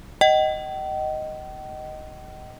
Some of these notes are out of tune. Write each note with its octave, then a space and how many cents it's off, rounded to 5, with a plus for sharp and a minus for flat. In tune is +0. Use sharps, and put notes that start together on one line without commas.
D#5 +0 G5 -45